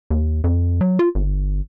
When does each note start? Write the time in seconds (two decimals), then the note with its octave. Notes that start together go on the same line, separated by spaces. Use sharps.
0.10 D#2
0.44 F2
0.81 F#3
0.99 F4
1.15 G1